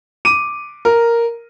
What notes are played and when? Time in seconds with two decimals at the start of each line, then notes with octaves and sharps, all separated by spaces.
0.25 D6 D#7
0.85 A#4